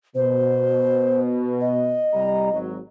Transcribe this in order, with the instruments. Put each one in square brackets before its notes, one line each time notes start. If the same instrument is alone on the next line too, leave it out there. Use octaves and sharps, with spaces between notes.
[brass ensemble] B2 [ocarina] C5
[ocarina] D#5
[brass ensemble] C2 G3 A#5
G#1 F#3